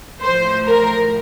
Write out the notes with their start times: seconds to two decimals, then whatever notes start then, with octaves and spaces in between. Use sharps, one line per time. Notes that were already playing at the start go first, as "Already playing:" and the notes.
0.21 A2 F3 C5
0.67 A#4